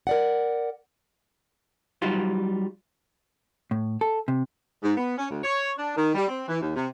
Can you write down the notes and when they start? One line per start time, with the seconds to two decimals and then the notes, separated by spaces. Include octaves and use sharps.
0.07 A#4 D5 F#5
2.02 F#3 G3 D#4 F4
3.71 A2
4.01 A4
4.28 C3
4.83 G#2
4.98 B3
5.18 C#4
5.31 D2
5.44 C#5
5.77 D4
5.97 D#3
6.15 G3
6.28 C4
6.48 E3
6.61 D#2
6.76 C3